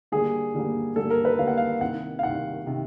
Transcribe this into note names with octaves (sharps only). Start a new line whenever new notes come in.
D3 G3 A#3 G#4
D3 G3 A#3
D3 G3 A#3 A4
A#4
B4
D3 G3 A#3 F5
F#5
F5
C2 C3 D#3 F#5
F5
C2 C3 D#3 F#5
C3 D#3